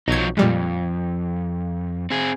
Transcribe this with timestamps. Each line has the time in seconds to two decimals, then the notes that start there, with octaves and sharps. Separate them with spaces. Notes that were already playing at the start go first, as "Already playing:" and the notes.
0.08 B1 F3 F#3 D#4 G#6
0.37 F2 A#2 G3 G#3
2.10 C4 G#4